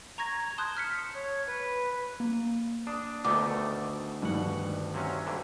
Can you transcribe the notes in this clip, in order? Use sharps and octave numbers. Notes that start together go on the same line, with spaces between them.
A#5 C#6 G#6 A#6
G#6
A5 C6 D#6 F#6 G6
F6 B6 C#7
C#5
B4
A#3
D4 D#6
D2 B2 D#3 A3 D6
G2 B2 D#3 F#5
C3 F#3 C#4
D2 G2 D3